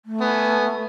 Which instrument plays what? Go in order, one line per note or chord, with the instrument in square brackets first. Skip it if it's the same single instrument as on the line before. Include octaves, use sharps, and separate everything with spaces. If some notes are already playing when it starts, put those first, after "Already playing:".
[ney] A3
[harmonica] B3 G#5